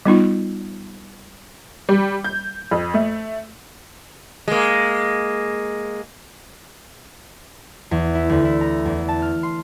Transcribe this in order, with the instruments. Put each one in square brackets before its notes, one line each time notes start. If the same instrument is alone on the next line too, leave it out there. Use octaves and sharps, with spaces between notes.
[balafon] G3 B3 D#4 F4
[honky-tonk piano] G3
G6
F2
A3
[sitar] G#3 A#3
[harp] E2
E4
D2
E4
A#5
E2
A5
F6
C6